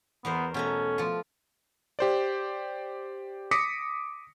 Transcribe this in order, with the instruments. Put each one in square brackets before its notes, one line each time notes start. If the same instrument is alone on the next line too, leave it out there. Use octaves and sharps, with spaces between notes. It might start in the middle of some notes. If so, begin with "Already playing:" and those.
[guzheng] E2 A#4 C5 [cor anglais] B3
[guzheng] B2 A3 A#5 [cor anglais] C#4
[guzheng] F3 F4
[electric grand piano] G4 C5 D5
D6 D#6 A#6 B6 C#7